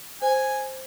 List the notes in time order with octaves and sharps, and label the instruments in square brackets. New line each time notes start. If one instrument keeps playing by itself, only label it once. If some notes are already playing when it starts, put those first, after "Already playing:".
[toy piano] C5 [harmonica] G#5